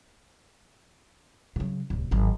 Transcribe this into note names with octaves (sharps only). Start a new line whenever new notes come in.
C#3 F#3
D1 C2
G#1 F#3